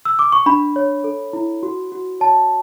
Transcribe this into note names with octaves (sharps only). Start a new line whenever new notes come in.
E6
D6
C#6
D4 B5
C#5
A4
E4
F#4
F#4
C#5 A5